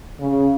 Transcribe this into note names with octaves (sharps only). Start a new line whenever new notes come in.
C#3